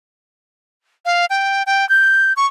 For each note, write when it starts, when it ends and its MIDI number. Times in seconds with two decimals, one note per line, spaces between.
1.05 1.26 77
1.30 1.63 79
1.66 1.87 79
1.89 2.33 91
2.37 2.46 85